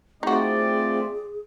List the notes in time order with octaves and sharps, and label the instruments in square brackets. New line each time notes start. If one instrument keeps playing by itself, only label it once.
[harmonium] A3 C4 F4 [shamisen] D#4 F#4 [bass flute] G#4 [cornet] D5